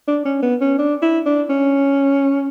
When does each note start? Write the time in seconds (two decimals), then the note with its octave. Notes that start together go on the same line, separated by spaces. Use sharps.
0.08 D4
0.25 C#4
0.42 B3
0.61 C#4
0.78 D4
1.02 E4
1.26 D4
1.50 C#4